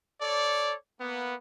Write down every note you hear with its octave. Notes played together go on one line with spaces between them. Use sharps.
A4 C#5 D5
A#3 B3